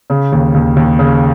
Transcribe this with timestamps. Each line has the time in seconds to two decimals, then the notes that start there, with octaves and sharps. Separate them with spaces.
0.10 C#3
0.32 D#2
0.54 D#2
0.77 D#2
0.99 C#3